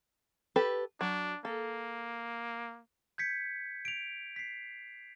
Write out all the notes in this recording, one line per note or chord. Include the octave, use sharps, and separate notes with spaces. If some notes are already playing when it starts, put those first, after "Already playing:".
G4 A4 B4
F#3 D4
A#3 A4
G6 G#6 B6 C#7
D7 F7
B6 C7